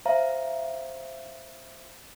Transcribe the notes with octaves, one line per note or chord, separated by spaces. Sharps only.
C5 E5 F5 A#5